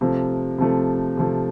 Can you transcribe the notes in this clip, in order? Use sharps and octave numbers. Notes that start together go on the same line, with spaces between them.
C3 F3 A3
C3 F3 A3
C3 F3 A3